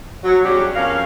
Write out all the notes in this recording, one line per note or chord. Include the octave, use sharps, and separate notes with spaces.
F#3
E2 G3 C#4 D4 F#4 G4
F2 C#4 A#4 F5